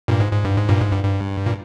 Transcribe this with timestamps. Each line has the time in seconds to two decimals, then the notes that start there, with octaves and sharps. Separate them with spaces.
0.08 G2 A#2
0.20 G#2
0.32 G#2
0.44 G2
0.56 G#2
0.69 G2 A#2
0.81 G#2
0.92 G2
1.04 G2
1.46 A#2